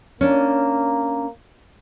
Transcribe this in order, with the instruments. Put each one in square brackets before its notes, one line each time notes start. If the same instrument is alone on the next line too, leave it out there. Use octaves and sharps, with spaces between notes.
[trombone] A#3 [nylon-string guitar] C#4 D4